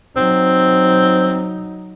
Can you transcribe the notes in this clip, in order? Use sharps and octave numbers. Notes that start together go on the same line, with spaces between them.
F#3 C4 D#4